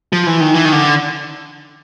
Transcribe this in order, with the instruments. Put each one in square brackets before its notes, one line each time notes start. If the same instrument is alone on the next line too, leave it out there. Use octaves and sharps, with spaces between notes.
[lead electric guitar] F3
E3
D#3
E3
D#3
D3